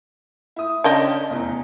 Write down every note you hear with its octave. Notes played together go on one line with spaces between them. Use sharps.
E4 D#6
C#3 C#4 D4 D#5 G5 A5
F1 E2